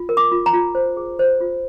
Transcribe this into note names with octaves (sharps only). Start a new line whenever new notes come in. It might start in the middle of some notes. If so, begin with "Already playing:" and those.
Already playing: F4
A#4
D6
F4
A#5
F4
C5
G#4
C5
F4